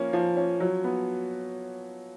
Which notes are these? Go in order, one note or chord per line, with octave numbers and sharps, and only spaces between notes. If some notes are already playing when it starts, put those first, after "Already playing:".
Already playing: F3 A#3 C#4
F3
C#4
F#3
B3